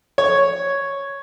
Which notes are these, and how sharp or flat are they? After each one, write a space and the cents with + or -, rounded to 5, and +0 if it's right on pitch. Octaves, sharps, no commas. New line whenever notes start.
C#5 +0 C#6 +0